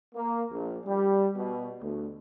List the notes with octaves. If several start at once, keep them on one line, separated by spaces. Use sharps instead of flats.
A#3
A#1
G3
B2
D2